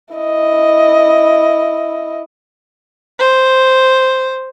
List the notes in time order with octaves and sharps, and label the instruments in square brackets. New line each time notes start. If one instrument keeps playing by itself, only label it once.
[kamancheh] E4 D#5
[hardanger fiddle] C5